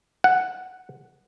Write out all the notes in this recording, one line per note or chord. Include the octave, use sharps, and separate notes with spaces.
F#5